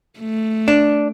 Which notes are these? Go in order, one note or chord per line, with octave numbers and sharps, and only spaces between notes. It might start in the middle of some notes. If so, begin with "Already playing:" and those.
A3
D4